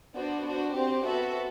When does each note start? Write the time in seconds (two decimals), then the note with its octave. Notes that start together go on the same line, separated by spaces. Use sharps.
0.14 B3 D4 F#4 C5
0.45 D4 F#4 C5
0.74 C4 G4 C5
1.04 B3 F#4 A4 E5